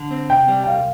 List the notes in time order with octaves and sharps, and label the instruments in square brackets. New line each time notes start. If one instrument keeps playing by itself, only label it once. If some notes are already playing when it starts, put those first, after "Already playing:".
Already playing: [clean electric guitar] D3
C4
[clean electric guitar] C3 [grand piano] G5
[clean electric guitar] G3
[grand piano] G5
[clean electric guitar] C2 [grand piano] F5